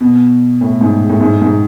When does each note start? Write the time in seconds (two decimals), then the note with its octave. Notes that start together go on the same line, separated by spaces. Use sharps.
0.01 B2
0.61 A2
0.81 G#2
1.09 A2
1.21 G#2
1.41 G#2